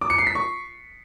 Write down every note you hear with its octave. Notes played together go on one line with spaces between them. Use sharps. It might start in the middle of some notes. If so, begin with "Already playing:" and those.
D6
C#7
C7
B6
C#6